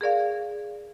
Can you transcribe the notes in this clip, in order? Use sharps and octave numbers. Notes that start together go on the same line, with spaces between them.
G#4 A#4 D5 F5